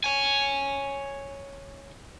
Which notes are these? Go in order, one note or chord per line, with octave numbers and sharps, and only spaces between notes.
C#5 G#5